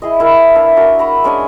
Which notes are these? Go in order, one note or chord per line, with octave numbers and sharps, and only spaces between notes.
E4 G#4 D#5
E4 A#4 G#5
D4 B4 E5 F5
D4 F#4 A#4
A#5 B5 C#6
G#3 C#4 D4 G#5